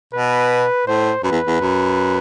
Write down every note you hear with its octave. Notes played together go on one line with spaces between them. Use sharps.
B2 B4
A2 C5
F#2 B4
E2
E2
F#2